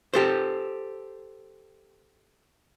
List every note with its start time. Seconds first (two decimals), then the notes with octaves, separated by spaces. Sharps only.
0.14 G4 A4 C5